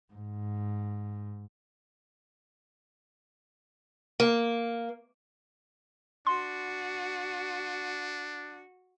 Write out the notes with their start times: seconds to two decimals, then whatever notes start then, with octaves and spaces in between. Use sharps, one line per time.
0.14 G#2
4.20 A#3
6.27 D4 F#4 C6